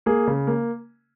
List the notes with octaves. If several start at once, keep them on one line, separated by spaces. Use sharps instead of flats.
A#3 G#4
C#3
A#3